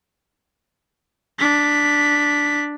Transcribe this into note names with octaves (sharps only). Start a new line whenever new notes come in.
D4 B6